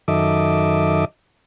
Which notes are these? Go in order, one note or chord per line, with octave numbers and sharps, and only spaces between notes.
F#2 D#3 A4 D#5 E5 D6